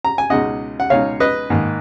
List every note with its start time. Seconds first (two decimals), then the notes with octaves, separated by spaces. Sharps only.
0.05 A#5
0.18 G#5
0.30 C#2 B2 G#3 D#4 D#5 F#5
0.80 F#5
0.90 C#2 B2 G#3 D#4 C#5 F5
1.20 B4 D#5
1.50 G#2 D#3 A#3